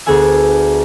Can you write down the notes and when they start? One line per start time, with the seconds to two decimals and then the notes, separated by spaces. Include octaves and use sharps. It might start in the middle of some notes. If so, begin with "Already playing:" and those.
0.06 D2 B3 G#4 A4 G#5 E6